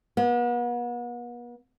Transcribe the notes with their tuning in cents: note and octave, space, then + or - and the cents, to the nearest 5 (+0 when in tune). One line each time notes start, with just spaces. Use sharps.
B3 -40